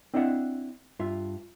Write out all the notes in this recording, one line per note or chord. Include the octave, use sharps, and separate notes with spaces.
C4 D4 E4 D#5 E5 F#5
G2 F4 E5